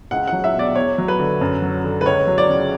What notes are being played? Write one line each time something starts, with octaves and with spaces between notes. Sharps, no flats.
C#2 F#5
F#5
F#3
E5
B2 D5
E2 C#5
F#3
B4
D3
F#2
F#3
D3
B4
C#2 C#5
F#3
D5
C#3